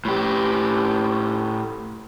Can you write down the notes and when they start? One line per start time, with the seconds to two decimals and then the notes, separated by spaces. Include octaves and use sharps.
0.05 A2 G4